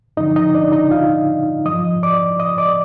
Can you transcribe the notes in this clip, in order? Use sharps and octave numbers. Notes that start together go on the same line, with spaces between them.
G2 D3 F3 D#4 D#5
D#4 D#5
D4 D5
D#4 D#5
F4 F5
G2 F3 D#5 D#6
D5 D6
D#5 D#6
D5 D6